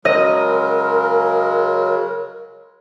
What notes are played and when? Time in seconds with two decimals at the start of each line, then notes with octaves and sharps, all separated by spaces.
0.05 C#3 F#3 G#3 A#4 D#5